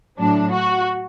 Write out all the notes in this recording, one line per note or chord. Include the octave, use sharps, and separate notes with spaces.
A2 F#3 D4
F#4